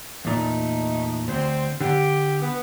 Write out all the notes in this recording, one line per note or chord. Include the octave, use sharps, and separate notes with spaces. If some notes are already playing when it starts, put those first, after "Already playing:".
E2 A#2 A3 D#4
D2 C4 C5
D3 G4
B3